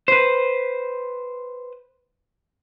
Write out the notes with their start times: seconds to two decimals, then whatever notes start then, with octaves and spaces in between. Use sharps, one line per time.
0.08 B4 C5